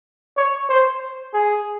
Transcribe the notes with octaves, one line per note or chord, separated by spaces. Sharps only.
C#5
C5
G#4